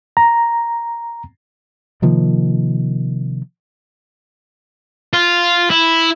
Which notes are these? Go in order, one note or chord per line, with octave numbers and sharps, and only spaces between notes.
A#5
C3 D#3 F3 A#3
F4
E4